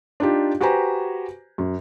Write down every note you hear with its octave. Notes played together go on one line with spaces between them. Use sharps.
D4 D#4 F4 G4
F#4 G4 B4 C5 G#5 A#5
F#2